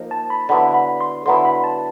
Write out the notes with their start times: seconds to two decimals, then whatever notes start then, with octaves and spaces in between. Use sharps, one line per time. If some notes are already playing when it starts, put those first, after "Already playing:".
Already playing: F3 A#3 D#4
0.11 A5
0.30 B5
0.49 D3 F#3 B3 E4 B5
0.74 B5
1.01 C6
1.26 D3 F#3 B3 E4 C6
1.45 B5
1.64 A5